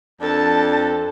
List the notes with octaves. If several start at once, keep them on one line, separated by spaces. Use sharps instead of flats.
F2 D4 A4 A5